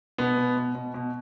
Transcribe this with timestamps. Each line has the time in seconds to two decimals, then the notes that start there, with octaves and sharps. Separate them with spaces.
0.18 B2 B3
0.37 B2
0.57 B2
0.75 B2
0.94 B2